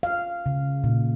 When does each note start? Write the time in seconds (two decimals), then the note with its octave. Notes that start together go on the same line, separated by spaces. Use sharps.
0.03 F5
0.46 C#3
0.84 A#2